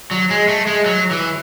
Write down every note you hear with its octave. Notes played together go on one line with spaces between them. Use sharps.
F#3
G#3
A3
G#3
F#3
E3